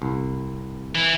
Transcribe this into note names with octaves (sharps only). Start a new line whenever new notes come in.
C2
E3